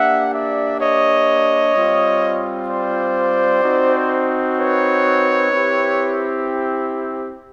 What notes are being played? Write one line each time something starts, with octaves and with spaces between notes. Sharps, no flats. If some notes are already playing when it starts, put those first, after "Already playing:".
Already playing: A#3 D4 G4 E5 F#5
D5 E5
C#5 D#5
G3 C4 F4
C5 D5
C4 D#4 F#4
B4 C#5
C4 E4 G4